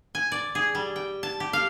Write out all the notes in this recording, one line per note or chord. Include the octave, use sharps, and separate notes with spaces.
G#5
D5
G#4
G3
G5
A5
G4
F5